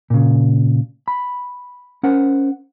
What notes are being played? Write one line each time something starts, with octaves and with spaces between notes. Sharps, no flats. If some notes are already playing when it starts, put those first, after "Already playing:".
A#2 C#3
B5
C#4 A#4 C5 F#5